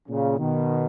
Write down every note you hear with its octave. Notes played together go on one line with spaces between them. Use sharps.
A#2 C#3
B2 D#3